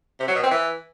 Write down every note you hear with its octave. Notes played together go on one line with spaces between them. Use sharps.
C3
F#3
B2
C4
E3